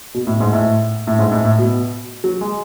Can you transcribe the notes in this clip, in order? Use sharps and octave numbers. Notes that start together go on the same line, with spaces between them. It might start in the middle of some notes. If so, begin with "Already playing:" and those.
B2
A2
G#2
A2
A2
G#2
A2
A2
B2
F#3
G#3